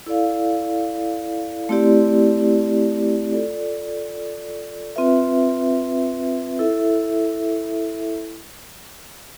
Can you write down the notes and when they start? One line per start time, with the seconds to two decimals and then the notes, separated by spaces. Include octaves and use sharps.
0.06 E4 A4 D5 F5
1.69 A3 C4 E4 G4 D5
3.32 F4 A4 D5
4.96 C4 F4 B4 E5
6.59 E4 A4 E5